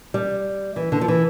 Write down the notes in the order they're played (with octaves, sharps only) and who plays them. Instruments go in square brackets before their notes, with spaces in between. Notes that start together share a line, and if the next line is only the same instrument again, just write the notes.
[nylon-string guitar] G3
E3
D3
F3
E3